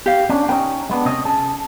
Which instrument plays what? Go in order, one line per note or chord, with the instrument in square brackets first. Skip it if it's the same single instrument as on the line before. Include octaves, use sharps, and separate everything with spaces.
[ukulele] G4 F5
[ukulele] C#4 [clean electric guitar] D4
[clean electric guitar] B3 C#4 D#4 [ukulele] G5
[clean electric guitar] G#3 B3 D4
C3 C#4 D#5
C#4 G#4 A5